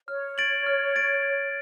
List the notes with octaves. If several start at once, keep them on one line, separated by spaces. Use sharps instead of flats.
C#5 F6
A6 D7 F#7
F6
A6 D7